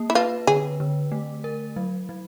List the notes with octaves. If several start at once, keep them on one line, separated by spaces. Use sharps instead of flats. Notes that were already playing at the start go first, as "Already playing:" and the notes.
Already playing: A#3
E4
F4 B4
D3 G#4
D3
A3
A#4
F#3
F#3